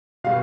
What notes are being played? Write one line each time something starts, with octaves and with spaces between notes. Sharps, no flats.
B2 G3 F5